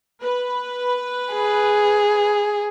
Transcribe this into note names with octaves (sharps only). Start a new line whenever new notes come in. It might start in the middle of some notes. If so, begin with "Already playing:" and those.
B4
G#4